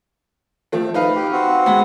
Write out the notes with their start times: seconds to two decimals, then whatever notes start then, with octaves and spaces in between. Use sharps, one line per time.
0.72 F3 A3 C4
0.94 D#4 B4 F5
1.15 G4
1.32 C4 F#4
1.66 G#3 B3